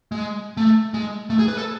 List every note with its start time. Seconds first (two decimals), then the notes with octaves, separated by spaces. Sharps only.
0.12 G#3
0.57 A3
0.94 G#3
1.30 A3
1.39 G#4
1.48 B4
1.57 A4